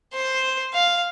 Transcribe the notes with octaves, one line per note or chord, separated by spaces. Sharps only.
C5
F5